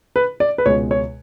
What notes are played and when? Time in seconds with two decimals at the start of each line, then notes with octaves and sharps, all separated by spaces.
0.16 B4
0.40 D5
0.58 B4
0.66 C#2 B2 G#3 C#5
0.91 C#5